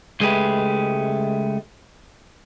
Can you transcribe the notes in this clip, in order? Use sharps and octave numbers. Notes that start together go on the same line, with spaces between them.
C#2 G#3 A3 G4 B4